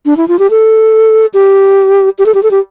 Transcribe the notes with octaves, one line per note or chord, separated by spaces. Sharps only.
D4
E4
F4
G4
A4
G4
G4
A4
G4
A4
G4